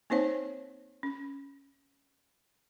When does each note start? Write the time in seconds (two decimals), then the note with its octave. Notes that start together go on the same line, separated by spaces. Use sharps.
0.10 A#3 C4 D#4 C5 C#5
1.03 C#4